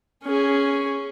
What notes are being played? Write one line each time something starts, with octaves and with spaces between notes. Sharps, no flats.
C#4 G#4